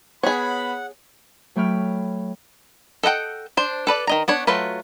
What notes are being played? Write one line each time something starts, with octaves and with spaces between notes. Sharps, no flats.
B3 G#4 C#5 F#5 B5
F#3 A3 C#5 G5 B5 F6
A4 D#5 F#5 G5
D4 C5
A4 B4 D5
D#3 D#5 A#5
B3 D4 C#5
F#3 A3 F4 B4